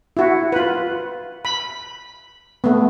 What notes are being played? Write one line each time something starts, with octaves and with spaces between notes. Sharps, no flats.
E4 F#4
F4 B4
B5
A3 B3